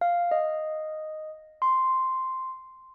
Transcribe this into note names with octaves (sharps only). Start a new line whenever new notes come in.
F5
D#5
C6